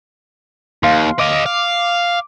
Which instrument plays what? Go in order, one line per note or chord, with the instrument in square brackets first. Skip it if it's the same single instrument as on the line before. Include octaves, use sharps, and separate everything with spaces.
[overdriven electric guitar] D#2 [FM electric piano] F5 C6
[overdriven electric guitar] D#5 F5 [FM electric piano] D6
[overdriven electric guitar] F5